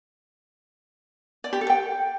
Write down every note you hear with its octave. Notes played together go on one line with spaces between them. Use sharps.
D5
G4
A4
G5